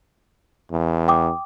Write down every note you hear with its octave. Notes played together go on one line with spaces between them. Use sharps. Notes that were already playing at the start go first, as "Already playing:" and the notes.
E2
G5 D6 D#6